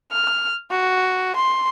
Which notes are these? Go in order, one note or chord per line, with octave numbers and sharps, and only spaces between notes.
F6
F#4
C6